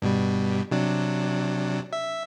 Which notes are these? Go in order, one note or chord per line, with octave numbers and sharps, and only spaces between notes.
G2 B2 G3
C3 F#3 D4
E5